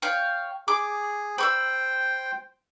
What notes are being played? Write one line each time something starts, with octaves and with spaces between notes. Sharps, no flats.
C#5 F5 G5
G#4 D6
C5 G5 B5 C#6 E6